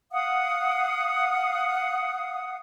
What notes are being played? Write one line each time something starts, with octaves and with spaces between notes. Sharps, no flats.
F5 F#5 D#6